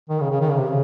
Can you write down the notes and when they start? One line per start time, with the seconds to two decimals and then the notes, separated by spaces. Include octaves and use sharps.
0.10 D#3
0.20 C#3
0.30 C#3
0.41 D#3
0.50 C#3
0.58 C3
0.68 C#3